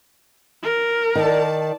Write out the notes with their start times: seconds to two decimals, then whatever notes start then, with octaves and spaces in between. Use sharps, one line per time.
0.63 A#4
1.15 D#3 D5 A5